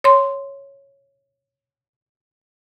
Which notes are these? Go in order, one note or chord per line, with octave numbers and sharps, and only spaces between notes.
C#5 C6